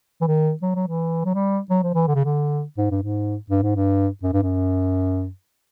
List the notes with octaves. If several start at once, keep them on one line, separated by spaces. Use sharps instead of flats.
E3
D#3
F#3
F#3
E3
F#3
G3
F#3
F3
E3
D3
C#3
D3
G#2
G2
G#2
G2
G#2
G2
F#2
G2
F#2